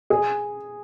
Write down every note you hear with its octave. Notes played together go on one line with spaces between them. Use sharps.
G#4